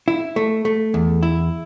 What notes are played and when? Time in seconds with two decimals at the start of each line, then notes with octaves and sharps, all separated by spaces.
0.08 E4
0.36 A3
0.65 A3
0.94 E2
1.23 E4